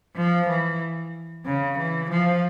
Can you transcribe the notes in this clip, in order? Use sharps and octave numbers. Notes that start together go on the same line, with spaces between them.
F3
E3
C#3
E3
F3